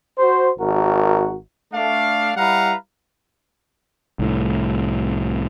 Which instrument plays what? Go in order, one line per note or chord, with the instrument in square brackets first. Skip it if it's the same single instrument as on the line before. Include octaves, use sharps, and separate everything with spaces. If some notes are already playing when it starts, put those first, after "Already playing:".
[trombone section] F#4 C5
G#1 F#4 A#4
[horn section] A3 D4 F5
G3 E4 B4 F5 F#5 A#5
[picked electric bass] C2 A2